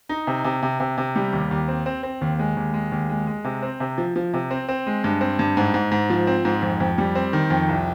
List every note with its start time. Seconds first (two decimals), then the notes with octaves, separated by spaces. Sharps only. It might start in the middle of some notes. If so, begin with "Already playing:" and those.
0.09 D#4
0.27 C3
0.44 C3
0.62 C3
0.80 C3
0.98 C3
1.16 G3
1.33 D#2
1.51 D#2
1.68 C4
1.86 C4
2.03 C4
2.21 D#2
2.39 G#3
2.57 D#2
2.74 G#3
2.92 D#2
3.09 G#3
3.27 G#3
3.44 C3
3.62 C4
3.80 C3
3.98 F3
4.16 F3
4.33 C3
4.51 C4
4.69 C4
4.87 G#3
5.04 G2
5.21 C4
5.39 G2
5.57 G#2
5.74 G#2
5.91 G#2
6.10 F3
6.27 C4
6.45 G#2
6.62 F2
6.80 F2
6.98 G3
7.15 C4
7.33 D#3
7.50 F2
7.68 C2